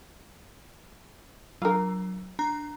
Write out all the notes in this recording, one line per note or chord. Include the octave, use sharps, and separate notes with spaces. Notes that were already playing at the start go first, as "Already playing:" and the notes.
F#3 D4 F4 A#4
D4 A#5